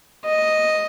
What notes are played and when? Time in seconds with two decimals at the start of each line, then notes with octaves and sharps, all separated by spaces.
0.26 D#5